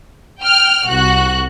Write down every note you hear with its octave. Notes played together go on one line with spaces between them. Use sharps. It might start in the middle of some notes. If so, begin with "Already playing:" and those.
G5 F6
C2 F#4 F#6